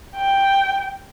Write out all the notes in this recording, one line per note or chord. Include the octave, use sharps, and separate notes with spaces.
G5